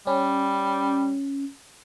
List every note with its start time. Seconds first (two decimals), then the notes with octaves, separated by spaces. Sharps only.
0.07 G3 C#4